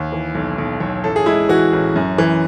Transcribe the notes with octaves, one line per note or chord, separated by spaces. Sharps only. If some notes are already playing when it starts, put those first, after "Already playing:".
Already playing: D#2
E3
B1
B1
B1
A1 A4
G#4
G#3 E4
E3 F#4
A1
F#2
E3